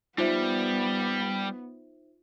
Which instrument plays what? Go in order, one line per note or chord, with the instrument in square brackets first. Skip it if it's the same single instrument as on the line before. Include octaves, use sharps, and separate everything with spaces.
[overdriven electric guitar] G3 [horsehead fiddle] B3 [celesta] D#4 C5 E5 [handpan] F4